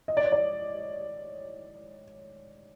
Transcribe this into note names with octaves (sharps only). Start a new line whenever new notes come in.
D#5
D5
C#5
D5